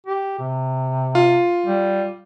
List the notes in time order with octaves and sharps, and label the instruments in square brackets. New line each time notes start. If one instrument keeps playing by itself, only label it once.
[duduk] G4
C3
[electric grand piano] F4
[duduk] G3